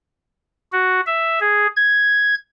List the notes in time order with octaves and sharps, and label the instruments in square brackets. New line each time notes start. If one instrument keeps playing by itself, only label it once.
[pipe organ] F#4
E5
G#4
G#6